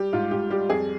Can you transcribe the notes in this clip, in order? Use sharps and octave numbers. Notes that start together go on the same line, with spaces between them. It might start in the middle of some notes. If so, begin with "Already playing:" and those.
Already playing: G3 G4
G#2 F4
G#2 G4
G3 G4
F2 G#4